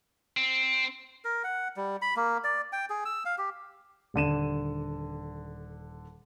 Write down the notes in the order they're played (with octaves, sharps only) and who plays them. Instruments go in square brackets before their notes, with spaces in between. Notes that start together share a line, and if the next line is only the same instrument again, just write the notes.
[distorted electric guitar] C4
[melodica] A#4
F#5
G3
B5
A#3
D5
G5
G#4
E6
F5
G4
[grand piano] D#1 D3 D#7 E7